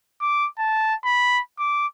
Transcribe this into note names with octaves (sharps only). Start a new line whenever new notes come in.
D6
A5
B5
D6